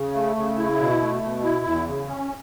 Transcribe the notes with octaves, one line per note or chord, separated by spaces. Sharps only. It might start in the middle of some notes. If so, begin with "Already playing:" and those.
Already playing: C#3
A3
C#3
E4
B2
A3
B2
E4
E2
C#3
C#4